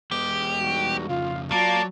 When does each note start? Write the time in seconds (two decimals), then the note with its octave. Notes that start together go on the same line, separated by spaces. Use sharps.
0.11 E2 G#3 B3 G4
0.61 G3 D#4 F#4
1.09 F2 C#3 F4 F5
1.52 F#3 A#3 F4 D5 A5